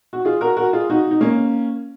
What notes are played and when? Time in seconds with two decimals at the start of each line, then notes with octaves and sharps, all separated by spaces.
0.13 F#4
0.25 F4 G#4
0.41 F#4 A#4
0.57 F#4 A#4
0.73 F4 G#4
0.90 D#4 F#4
1.11 D#4
1.21 A#3 C#4